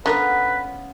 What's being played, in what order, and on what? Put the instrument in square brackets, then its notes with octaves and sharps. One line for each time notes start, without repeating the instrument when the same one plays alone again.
[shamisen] D3 A#4 [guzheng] B3 C#4 F4 [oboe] B4